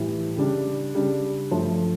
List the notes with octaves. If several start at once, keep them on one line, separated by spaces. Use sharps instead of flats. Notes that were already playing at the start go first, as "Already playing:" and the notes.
Already playing: A2 E3 G3
C#3 G3 D4
C#3 G3 D4
G2 F3 A3